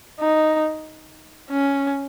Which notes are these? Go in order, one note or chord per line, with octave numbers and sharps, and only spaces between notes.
D#4
C#4